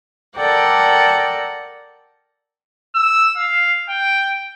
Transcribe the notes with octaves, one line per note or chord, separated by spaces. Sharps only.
A4 A#4 D5 F#5 G5
E6
F5
G5